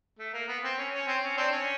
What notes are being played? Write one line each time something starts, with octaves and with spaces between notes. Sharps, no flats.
A3
A#3
B3
C4
C#4
C#4
C4
C#4
C4 D4
C#4